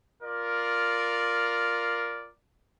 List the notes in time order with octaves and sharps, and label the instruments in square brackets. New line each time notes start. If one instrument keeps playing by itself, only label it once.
[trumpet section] F4 A#4 D5